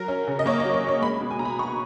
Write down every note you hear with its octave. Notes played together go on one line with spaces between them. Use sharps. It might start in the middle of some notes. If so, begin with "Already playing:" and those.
Already playing: F#3 A#4
C#4
C#3
D#5
A#3 C#5
D#5
F#3
C#5
C#4
C#5
G#3 B5
B2
G#5
B2 A#5
B5
B3 C#6